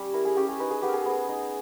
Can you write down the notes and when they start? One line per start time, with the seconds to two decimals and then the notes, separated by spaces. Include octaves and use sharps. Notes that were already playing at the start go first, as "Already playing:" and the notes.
Already playing: G3 C#4
0.13 E4 A#4
0.25 G#4
0.37 C#4 G4
0.48 G#4
0.60 D#4 B4
0.71 G#4
0.82 B3 G4
0.88 A#4
0.93 G#4
1.05 B3
1.29 D#4